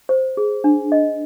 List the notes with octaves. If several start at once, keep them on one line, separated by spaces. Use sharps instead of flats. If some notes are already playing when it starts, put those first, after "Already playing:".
C5
G#4
D4
D#5